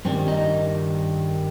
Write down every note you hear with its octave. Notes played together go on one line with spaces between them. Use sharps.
G2 D#3 G3 C4
D#4